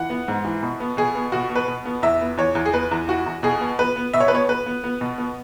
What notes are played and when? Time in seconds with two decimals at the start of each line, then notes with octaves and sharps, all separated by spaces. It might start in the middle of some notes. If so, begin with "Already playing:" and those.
Already playing: E3 F#5
0.10 B3
0.28 G#2
0.45 E3
0.63 B2
0.80 B3
0.97 B2 G#4
1.15 B3
1.32 B2 F#4
1.50 B3
1.56 B4
1.68 B2
1.85 B3
2.03 E2 E5
2.21 B3
2.37 E2 C#5
2.55 E2
2.65 G#4
2.74 B3 B4
2.91 E2
3.08 E3 F#4
3.26 E2
3.43 B2 G#4
3.61 B3
3.79 B3 B4
3.96 B3
4.13 B2 E5
4.20 C#5
4.28 B4
4.32 B3 C#5
4.49 B3 B4
4.66 B3
4.84 B3
5.01 B2
5.18 B3